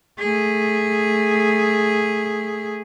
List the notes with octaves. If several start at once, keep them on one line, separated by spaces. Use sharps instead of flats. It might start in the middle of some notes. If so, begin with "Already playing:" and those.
A3 G#4